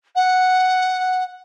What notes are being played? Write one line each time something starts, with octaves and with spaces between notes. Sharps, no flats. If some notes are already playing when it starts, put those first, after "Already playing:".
F#5